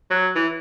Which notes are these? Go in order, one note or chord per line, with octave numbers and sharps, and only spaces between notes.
F#3
E3